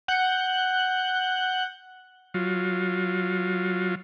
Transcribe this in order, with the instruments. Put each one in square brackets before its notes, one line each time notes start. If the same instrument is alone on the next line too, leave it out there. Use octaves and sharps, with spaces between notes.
[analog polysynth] F#5 F#6 G6
[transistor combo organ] F#3 F4